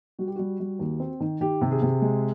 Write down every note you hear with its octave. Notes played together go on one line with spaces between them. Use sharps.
G3 F#4
G4
G3 F#4
G3
D#2
C4
D#3
D#3 G4
C3
G#4
C3
G#3